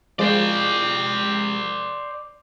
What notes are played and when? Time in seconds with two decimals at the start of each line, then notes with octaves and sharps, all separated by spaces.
0.19 F3 G#3 C5 D5